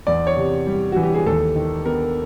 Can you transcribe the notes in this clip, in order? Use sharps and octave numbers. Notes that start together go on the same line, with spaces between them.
E2 D5
C#5
C3
G3
E3 F#4
G4
G#4
D#2 A4
D#3
B3 A#4